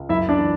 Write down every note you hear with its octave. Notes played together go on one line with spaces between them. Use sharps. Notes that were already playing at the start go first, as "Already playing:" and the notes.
Already playing: C#2
F#2 E4 E5
D4 D5
E3